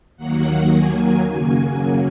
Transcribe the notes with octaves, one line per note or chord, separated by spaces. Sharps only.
D#2 D#3 F#3 A#3 F#5
G#5
F#2 C#3 F#3 A#3 G#5